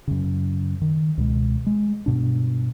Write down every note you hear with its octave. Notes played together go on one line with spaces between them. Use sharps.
F#2 C#3
D#3
C#2 B2 G#3
G#3
G2 B2 D4